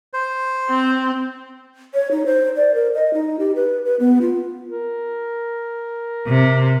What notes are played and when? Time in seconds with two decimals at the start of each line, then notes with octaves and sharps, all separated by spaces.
0.13 C5
0.70 C4
1.94 C#5
2.11 D#4
2.26 C5
2.56 D5
2.74 A#4
2.95 D#5
3.14 D#4
3.39 G4
3.56 B4
3.85 B4
4.00 B3
4.21 F4
4.68 A#4
6.27 C3